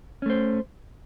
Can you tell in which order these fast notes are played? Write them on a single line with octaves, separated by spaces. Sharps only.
C#4 A3 C5